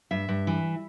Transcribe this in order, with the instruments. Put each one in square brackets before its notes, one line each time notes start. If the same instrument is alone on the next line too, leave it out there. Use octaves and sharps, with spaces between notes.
[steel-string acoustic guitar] G2 E5
G2
E3